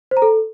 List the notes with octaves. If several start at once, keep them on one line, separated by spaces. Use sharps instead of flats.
C5
A#5
A4